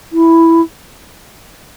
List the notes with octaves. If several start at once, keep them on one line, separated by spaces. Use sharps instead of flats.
E4